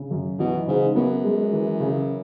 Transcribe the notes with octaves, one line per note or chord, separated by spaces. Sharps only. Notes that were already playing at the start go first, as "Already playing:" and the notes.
Already playing: C#3
F#2
B2 E3
G#2 C#3
F#2 B3
G#3
E3
C#3